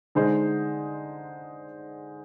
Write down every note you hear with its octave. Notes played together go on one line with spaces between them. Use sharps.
D3 G#3 D#4 G#4 C5